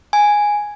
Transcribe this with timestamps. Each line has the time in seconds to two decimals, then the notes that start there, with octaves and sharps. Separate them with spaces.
0.13 G#5